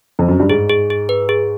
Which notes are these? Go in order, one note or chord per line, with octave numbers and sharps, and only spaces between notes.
F2
F#2
G2
G#2 G#4
G#4
G#4
B4
G#4